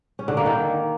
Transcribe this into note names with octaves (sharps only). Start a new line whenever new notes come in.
C#4
D3
A#3
D#3